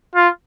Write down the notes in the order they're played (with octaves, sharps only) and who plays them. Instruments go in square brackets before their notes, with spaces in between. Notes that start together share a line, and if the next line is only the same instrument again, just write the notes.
[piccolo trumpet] F4